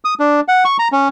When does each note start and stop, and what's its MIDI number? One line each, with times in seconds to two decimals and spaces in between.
0.05 0.14 87
0.20 0.40 62
0.48 0.64 78
0.65 0.77 85
0.79 0.88 82
0.92 1.08 61